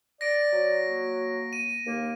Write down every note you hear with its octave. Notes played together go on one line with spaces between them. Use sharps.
D5 A#6 D7
F#3
A#3
D#7
D#2 A#3